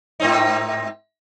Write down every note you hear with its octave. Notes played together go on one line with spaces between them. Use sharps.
G#2 C4 D#4